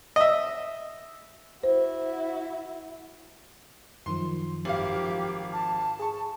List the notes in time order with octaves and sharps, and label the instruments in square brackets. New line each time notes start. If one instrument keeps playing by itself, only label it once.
[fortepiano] D#5 E5
[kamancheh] E4 F#4 [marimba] C5
[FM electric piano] F#2 D#3 F3 [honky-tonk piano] C6
[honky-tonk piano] G#1 F5 [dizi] G4
[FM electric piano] F3
[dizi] A5
[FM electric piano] G#4 C#6